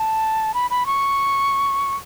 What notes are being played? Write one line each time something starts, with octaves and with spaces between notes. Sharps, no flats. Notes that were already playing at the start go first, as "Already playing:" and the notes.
Already playing: A5
B5
B5
C#6